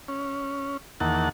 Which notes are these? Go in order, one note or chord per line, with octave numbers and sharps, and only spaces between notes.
C#4
E2 D#3 A#3 F#5 A5